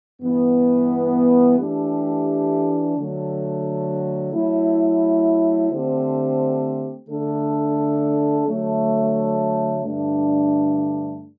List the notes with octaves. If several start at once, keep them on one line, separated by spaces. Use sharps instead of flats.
G2 E3 B3
E3 A3 D4 G4
D3 F#3 A3
F#3 A3 E4
D3 A3 C4 G4 C5
D3 A3 D4 A4
D3 F#3 A3
G2 D3 A3 D4